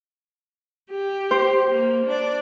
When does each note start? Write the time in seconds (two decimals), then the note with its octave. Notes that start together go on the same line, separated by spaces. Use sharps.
0.91 G4
1.31 C5
1.71 A#3
2.06 D4 D5